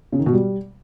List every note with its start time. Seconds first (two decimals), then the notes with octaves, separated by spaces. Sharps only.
0.12 C#3
0.19 D#3
0.26 B2
0.33 G3